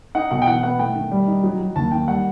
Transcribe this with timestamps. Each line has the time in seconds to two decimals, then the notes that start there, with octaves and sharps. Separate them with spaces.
0.15 D#4 F#5
0.31 B2 F#5
0.42 G5
0.47 E3 F#5
0.63 B3 F#5
0.79 A3 G5
0.95 D#3
1.11 G3
1.28 D#4
1.43 F#3
1.60 F#3
1.76 D#2 A5
1.92 D#3 G5
2.08 G3 F#5